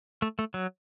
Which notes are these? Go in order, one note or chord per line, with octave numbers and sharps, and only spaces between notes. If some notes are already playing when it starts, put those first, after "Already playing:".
A3
A3
F#3